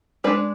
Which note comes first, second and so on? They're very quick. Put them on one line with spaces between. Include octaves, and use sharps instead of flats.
G#3 B4 D5 D4